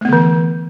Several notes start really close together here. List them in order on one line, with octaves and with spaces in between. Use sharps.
A3 B3 D3 E3